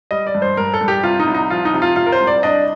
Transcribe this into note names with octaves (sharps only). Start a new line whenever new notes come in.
G3 D#5
D5
G2
C5
G2 A#4
A4
G2
G4
C3 F4
D#4
C2
D#4
F3 F4
D#4
C3
F4
C3 F4
A#4
C5
C2
D5
D4 D#5